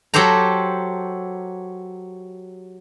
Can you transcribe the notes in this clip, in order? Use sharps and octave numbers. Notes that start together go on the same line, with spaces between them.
F#3 G4 A4 C5 A#5